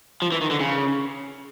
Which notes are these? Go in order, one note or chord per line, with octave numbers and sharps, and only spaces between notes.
F3
E3
D#3
D3
C#3